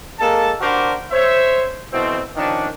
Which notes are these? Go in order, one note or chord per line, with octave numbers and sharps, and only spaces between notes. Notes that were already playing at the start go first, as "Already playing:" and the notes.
G#3 A#3 A4 A5
D4 F#4 G4 A#4 C5
C5 C#5 E5
B2 E3 A3 C4
D#3 F3 C#4 D4